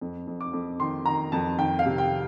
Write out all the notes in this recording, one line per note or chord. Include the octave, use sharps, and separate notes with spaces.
F2
F2
D6
F2
D#3 C6
D#3 A#5
F2 A5
D#3 G5
F5
C3
G5